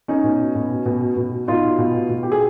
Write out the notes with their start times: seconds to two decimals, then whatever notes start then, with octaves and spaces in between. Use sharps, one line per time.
0.08 C#4 D#4
0.24 B2
0.55 B2
0.86 B2
1.17 B2
1.48 B2 D#4 F4
1.79 B2
2.10 B2
2.23 G4
2.32 G#4